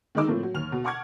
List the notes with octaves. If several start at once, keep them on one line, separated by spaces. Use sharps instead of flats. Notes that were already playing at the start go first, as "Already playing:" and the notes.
D#3 G#3 D#4 D6 E6
A2 F3 A3 A#3 C4
F#3
D#2 F6 F7
B2
F#5 A5 C#6 D6 F6 G#6